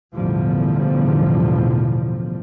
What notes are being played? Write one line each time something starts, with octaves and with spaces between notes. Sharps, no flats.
A1 E2 B2 D3 F3 G3